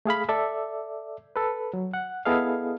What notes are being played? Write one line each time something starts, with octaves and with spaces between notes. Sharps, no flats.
A3 G#4 F5 B5
A4 D5 E5
A4 B4
F#3
F#5
B3 E4 G#4 A4 D#5 F5